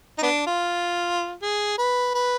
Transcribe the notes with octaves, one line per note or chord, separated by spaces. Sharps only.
D#4
B3 D4
F4
G#4
B4
B4